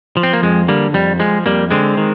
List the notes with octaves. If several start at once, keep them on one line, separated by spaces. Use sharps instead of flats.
F3
C4
A#3
F2 G#3
D3 G3 A#3
F2 G3
F3 G#3
F2 G3 A#3
D3 G#3 C4
D#3